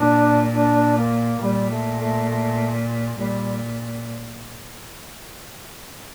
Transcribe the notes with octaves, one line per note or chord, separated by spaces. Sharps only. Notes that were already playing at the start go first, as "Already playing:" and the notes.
Already playing: A#2 D4
D4
A#3
A#2 G3
A3
A3
A3
A#2 G3